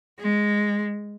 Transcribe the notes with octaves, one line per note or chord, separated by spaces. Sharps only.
G#3